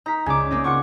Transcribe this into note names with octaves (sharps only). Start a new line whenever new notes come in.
D#4 A#4 A#5 B6
C#2 D5 G#5 D6
A#3 C4 D#4
F4 F#5 C#6 D6 C#7